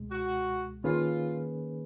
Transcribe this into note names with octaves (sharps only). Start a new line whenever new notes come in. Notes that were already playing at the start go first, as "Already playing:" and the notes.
Already playing: C#2 B2 G#3
F#4
D#3 A#3 C#4 F4 G#4 B4